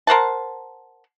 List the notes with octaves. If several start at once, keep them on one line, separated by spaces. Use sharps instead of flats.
A#4 C5 F#5 A5